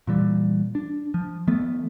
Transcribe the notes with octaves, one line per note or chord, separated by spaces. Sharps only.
A#2 E3 G3
D4
F3
D#3 F3 A3 B3